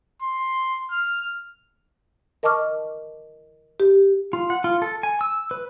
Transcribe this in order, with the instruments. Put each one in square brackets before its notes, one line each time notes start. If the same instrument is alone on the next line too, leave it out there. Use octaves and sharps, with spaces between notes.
[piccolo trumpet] C6
F6
[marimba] A#4 D#5 A5 C#6 D6 F6
G4
[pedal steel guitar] F4
F#5
F4
A4
G#5
E6
B4